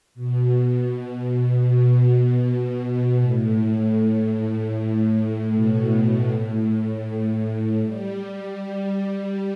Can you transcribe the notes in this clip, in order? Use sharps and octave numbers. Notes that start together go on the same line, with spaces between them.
B2
B2
A2
B2
A2
G3